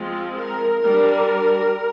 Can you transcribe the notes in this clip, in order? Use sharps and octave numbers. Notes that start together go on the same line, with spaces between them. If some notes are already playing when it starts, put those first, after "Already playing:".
Already playing: F3 G#3 C4 F4
A#4
G3 D4 A#4